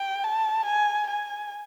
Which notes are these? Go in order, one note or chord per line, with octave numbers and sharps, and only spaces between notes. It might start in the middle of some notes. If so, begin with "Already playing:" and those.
Already playing: G5
A5
G#5
G#5